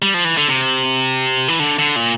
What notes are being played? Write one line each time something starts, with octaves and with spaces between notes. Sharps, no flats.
G3
F3
E3
D3
C3
E3
D3
D3
A#2